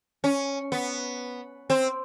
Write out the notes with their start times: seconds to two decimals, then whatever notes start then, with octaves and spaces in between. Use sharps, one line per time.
0.24 C#4
0.72 B3
1.70 C4